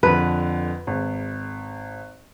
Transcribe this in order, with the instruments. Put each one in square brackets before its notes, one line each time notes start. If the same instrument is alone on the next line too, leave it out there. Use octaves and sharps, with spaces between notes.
[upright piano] F2 D3 [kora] B4
[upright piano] G#1